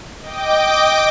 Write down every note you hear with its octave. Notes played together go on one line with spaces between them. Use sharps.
D#5 G5 D6